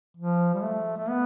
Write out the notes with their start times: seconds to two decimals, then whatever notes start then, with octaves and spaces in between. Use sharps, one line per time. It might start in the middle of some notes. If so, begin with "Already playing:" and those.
0.17 F3
0.54 G3
0.62 A3
0.97 A3
1.09 B3